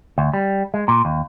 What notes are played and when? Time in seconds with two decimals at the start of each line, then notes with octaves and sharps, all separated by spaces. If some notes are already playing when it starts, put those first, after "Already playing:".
0.18 D2
0.34 G3
0.74 G#3
0.88 A#2
1.05 D#2